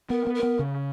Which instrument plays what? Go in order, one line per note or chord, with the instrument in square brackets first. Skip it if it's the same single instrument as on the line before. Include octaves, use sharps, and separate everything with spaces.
[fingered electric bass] B3 [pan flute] A#4
[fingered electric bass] B3
[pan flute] A#4
[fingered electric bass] B3
C#3